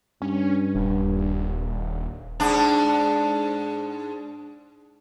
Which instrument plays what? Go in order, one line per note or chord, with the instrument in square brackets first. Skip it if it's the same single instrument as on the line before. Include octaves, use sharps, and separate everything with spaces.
[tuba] G2 [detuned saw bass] C#4
[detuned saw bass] D#1
[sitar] G#2 D4